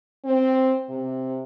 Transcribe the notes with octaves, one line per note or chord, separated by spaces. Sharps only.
C4
C3